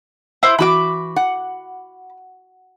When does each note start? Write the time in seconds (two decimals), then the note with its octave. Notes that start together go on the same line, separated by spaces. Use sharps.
0.43 E4 C5
0.59 E3 F#4 B5 D6
1.16 F#5